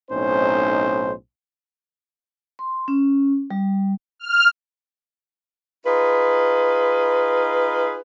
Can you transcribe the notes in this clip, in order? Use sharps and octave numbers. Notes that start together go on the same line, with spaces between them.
B1 A2 C4 C#4 D#4 C5
C6
C#4
G3
F6
D#4 F4 G#4 B4